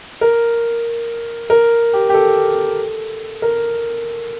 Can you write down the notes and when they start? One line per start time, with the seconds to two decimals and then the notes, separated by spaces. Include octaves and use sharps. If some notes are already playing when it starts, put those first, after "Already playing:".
0.21 A#4
1.50 A#4
1.93 G4
2.09 G4
2.14 A4
3.42 A#4